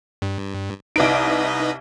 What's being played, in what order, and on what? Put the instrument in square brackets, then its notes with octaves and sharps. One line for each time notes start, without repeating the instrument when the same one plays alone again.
[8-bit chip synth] G2
[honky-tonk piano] C2 D7 [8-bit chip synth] D#4 B4 D#5